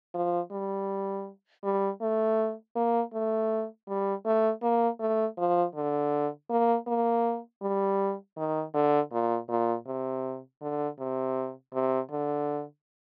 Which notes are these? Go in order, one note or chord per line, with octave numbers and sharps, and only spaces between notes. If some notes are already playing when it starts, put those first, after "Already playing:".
F3
G3
G3
A3
A#3
A3
G3
A3
A#3
A3
F3
D3
A#3
A#3
G3
D#3
D3
A#2
A#2
C3
D3
C3
C3
D3